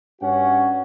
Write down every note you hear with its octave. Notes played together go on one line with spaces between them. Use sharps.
G2 C#4 F#4 C#5 F#5